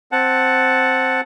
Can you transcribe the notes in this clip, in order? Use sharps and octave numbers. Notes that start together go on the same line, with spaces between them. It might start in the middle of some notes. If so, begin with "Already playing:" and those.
C4 F#5 A5